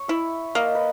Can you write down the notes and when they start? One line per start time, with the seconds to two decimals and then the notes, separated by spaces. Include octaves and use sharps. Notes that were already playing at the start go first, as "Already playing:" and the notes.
Already playing: C#5
0.08 E4 E5
0.55 A#3 D#5
0.75 B4